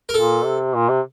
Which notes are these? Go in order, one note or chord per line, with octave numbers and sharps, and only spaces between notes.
A#4
A#2 A4
C3
A#2
C3